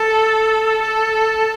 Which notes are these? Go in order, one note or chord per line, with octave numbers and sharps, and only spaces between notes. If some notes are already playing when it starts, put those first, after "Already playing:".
Already playing: A4
A4